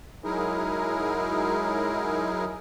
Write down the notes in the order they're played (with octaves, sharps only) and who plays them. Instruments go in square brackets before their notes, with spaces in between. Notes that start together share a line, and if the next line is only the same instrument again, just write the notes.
[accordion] F#3 G#3 D#4 E4 G#4 A#4